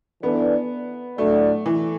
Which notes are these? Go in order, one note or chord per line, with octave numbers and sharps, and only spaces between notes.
E3 B3 D4 A4 D5
A2 F#3 A3 D4 F#4 D5
E3